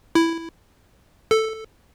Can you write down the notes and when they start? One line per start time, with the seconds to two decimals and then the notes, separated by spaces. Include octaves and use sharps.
0.15 E4
1.31 A4